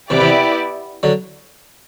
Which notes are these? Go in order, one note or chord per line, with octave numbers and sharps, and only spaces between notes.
C3 E3 B3 E4 G4 D5
C3 E3
D3 F#3